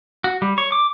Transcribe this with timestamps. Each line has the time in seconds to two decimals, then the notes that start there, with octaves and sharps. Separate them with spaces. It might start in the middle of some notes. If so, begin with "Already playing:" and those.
0.24 F#4
0.42 G3
0.58 C#5
0.72 D6